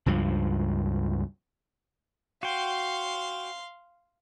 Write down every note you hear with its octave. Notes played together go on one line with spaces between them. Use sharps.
C#2 G2 F3
F#4 F5 G5 C6